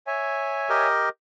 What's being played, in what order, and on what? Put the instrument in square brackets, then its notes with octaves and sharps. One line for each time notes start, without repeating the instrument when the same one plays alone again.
[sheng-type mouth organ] C#5 E5 G#5
[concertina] G4 A#4 D#5